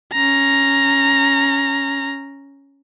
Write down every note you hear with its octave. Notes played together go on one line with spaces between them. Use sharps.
C#4 A#5